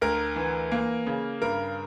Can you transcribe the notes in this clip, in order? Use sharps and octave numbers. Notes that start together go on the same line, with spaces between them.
D2 A#4
E3
A#3
C#3
G2 A#4